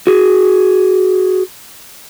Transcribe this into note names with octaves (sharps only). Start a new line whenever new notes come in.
F#4 G#4